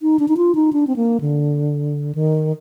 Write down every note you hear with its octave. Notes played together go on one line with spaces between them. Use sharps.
D#4
D4
D#4
F4
D#4
D4
C4
A#3
D3
D#3